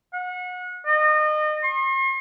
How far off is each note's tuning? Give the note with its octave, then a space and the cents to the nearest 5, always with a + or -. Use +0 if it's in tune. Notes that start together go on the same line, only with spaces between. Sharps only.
F#5 -30
D#5 -30
C6 +45